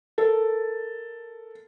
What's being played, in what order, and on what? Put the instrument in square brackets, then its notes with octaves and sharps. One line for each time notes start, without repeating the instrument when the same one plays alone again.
[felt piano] A4 A#4